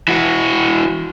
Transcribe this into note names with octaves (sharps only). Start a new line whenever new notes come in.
E3 F#4